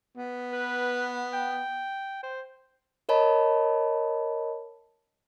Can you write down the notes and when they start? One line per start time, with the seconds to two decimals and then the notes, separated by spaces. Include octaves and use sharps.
0.17 B3
0.52 B4
1.34 G5
2.23 C5
3.09 A#4 C#5 D#5 A5 B5